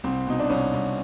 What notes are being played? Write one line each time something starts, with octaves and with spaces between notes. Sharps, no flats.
C2 C4
B2 D#4
D4
C2 C#4
C2